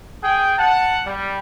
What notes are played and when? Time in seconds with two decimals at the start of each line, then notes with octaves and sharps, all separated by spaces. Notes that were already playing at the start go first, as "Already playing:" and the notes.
0.22 G#4 G5
0.58 F#5 A5
1.05 G3